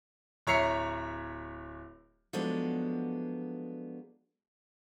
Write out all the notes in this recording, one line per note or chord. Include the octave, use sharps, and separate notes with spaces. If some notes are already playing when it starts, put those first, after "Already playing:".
D1 C#5 E5 A#5 C7 C#7
F3 F#3 G#3 B3 D4 A4